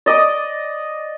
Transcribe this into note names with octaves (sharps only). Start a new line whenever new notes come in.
D5 D#5 D6 D#6